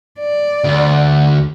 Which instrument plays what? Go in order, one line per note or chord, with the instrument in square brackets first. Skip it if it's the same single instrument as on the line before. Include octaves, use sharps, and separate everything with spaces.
[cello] D5
[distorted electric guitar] D2